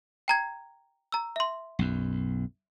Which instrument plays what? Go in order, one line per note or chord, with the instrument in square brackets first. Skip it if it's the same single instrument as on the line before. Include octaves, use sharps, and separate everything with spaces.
[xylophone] G5 A#5 G#6
A#5 E6
E5 C6
[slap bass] B1 F#2